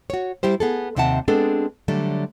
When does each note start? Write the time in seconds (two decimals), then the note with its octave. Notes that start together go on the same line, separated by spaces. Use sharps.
0.10 F#4 C#5
0.43 G3 E4 G4 C5
0.60 B3 G#4 A4
0.96 D#2 C3 C4 E5 F#5 A5
1.28 G#3 B3 C4 D4 G#4 A4
1.88 D3 F#3 G3 A3